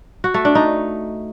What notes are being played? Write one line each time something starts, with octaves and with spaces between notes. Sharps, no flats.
F#4
A3
D4
D#4